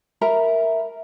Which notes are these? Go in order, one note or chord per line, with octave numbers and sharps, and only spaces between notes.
A#4 E5 A#5 B5